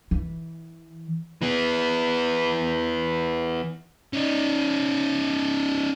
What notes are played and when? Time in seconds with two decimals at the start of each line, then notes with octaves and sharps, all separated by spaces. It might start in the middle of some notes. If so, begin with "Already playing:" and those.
0.11 E3
1.42 E3 B3
4.13 C#4 D#4